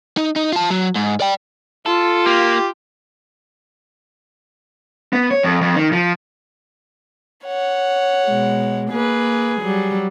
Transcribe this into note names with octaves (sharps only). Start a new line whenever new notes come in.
D#4
D#4
F4 A5
F#3
G#2
D5 G5
F4 A4
A#3 G4
B3
C#5
F2
F2
D#3
F3
C#5 F#5
B2 G#3
A#3 G#4 B4
F#3 G3